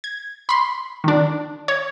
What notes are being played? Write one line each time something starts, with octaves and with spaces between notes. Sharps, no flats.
G#6
B5 C6
D#3 D4
C#5